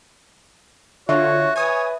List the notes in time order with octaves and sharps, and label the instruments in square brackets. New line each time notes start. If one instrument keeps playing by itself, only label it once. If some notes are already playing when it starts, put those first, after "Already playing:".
[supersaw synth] D3 F4 [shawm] F#4 [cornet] C#5 [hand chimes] E5
[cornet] B4 [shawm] C#5 [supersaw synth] G#5 D#6